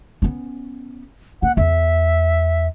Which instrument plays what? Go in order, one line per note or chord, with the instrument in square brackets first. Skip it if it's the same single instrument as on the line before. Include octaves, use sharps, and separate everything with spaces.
[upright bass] B3 C#4
[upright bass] A#3 [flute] F#5
[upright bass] E2 [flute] E5